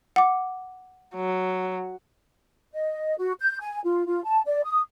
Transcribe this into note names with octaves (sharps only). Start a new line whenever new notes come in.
F#5 D6
F#3
D#5
F#4
G6
G#5
F4
F4
A5
D5
D#6